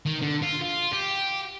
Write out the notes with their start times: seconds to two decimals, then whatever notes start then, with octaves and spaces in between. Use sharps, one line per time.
0.06 D#3
0.21 D3
0.42 F4
0.62 F4
0.93 G4